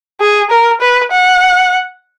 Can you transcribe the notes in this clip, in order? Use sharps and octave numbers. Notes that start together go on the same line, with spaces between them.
G#4
A#4
B4
F#5